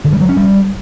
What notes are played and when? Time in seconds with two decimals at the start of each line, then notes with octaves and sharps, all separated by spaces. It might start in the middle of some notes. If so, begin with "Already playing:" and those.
0.04 D3
0.13 G3
0.21 F#3
0.29 C#4
0.37 G3